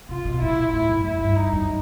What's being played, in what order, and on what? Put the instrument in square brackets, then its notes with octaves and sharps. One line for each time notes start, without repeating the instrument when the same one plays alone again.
[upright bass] C3 [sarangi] F4
[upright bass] B2
[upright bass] A#2 [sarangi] E4
[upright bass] A2 [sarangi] E4
[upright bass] F#2
[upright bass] F2 [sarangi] E4
[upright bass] G2
[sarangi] D#4
[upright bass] F#2